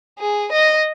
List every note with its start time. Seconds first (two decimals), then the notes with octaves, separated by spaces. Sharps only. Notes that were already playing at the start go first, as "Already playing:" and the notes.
0.19 G#4
0.52 D#5